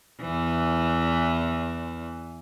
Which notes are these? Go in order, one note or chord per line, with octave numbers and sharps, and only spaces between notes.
E2 E3